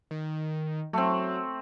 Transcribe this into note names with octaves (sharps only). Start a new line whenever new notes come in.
D#3
F#3 A3 C4